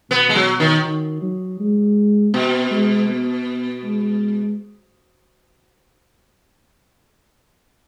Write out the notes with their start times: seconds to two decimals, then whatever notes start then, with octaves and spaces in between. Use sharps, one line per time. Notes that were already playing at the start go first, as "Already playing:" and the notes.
0.10 B2 B3
0.29 G#3
0.35 F#3
0.60 D#3
0.85 D#3
1.22 F#3
1.60 G#3
2.33 B2 B3
2.71 G#3
3.08 B3
3.83 G#3